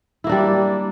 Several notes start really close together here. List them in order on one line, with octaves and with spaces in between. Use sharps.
E4 A#3 D4 G3